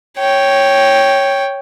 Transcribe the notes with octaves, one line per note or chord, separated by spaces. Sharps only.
C#5 G5